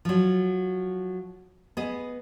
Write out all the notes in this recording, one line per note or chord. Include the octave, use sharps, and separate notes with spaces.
F3 F#3
B3 G#4 D#5